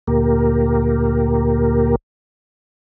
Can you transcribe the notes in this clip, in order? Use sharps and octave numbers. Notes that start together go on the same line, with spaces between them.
D2 A#2 A#3 G4 A#4